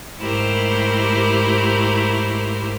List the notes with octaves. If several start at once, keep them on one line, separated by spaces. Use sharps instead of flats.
G#2 A3 E4 G4 A#4 C5